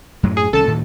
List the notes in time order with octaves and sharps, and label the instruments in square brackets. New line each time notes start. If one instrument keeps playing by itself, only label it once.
[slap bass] F#2 A2 F#3
[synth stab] G#4
[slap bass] C2 D#3 C#4 [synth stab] A4 A5
[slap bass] D2 A2 D#3